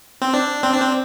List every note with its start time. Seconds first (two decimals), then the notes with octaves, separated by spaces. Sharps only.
0.22 C4
0.33 D4
0.63 C4
0.72 D4
0.81 C4